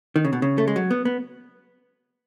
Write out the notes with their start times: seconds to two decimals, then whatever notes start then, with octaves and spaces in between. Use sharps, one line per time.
0.16 D#3
0.25 C#3
0.33 B2
0.42 C#3
0.58 A3
0.67 G#3
0.76 F#3
0.91 B3
1.05 B3